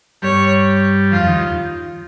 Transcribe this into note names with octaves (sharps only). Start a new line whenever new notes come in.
G2 G3 C#5
F2 F3 F4
D#2 D#3